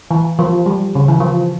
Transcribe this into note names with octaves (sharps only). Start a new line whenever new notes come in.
E3
F3
G3
C#3
E3
F3